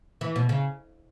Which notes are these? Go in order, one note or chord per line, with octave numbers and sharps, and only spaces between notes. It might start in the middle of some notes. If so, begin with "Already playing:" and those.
E3
B2
C#3